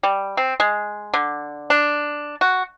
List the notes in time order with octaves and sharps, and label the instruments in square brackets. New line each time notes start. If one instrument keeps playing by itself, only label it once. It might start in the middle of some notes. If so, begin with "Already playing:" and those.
[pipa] G3
C4
G#3
D3
D4
F#4